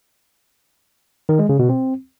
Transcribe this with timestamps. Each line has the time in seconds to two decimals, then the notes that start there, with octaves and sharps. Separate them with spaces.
1.29 D#3
1.39 G#3
1.49 C#3
1.59 B2
1.69 C4